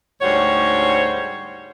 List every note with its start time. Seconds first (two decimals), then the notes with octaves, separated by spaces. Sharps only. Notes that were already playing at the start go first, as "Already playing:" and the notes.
0.22 D2 G#2 G3 F#4 C5 C#5